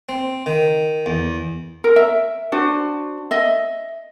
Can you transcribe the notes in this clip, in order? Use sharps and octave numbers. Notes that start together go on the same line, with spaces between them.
C4
D#3
E2
A#4
E5
D4 F#4 C5
D#5 E5